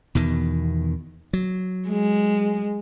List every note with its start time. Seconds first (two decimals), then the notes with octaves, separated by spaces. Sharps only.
0.15 E2 B2 D#3
1.33 F#3
1.88 G#3